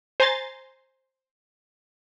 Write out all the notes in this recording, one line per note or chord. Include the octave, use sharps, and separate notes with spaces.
C5 G#5 A#5 C6 A6